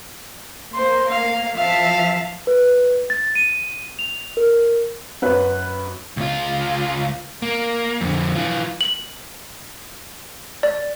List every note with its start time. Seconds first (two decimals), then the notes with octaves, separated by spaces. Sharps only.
0.73 A#3 C5 C6
1.10 F5
1.57 F3 E5 F5 A5
2.47 B4
3.10 A6
3.35 D#7
3.99 F7
4.37 A#4
5.22 F#2 B4
6.17 C#2 F4
7.42 A#3
8.01 F2 D3
8.35 E3 F4
8.81 F#7
10.63 D5